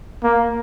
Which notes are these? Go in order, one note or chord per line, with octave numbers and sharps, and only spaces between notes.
A#3